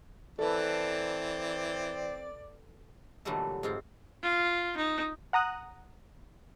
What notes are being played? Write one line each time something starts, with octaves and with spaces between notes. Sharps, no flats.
E3 C4 A4 B4 D5
A#2 D3 E3 F#3 G3 A3
G#2 C4 F4
F4
D#4
F#5 A#5 D#6 F#6